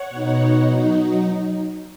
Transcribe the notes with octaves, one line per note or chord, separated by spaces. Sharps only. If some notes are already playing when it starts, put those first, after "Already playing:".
Already playing: C#5 F#5
B2 B3 D#4
F#3 D#4